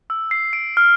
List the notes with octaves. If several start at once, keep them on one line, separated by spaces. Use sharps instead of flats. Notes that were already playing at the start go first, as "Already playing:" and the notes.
E6
C7
D7
F6